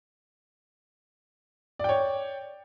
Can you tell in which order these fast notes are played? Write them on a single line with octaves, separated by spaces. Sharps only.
D5 G5 C#5